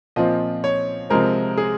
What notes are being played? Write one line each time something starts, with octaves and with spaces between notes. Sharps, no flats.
A#2 F3 C4 D#5
C#5
C3 F3 G#3 C4 A#4
G#4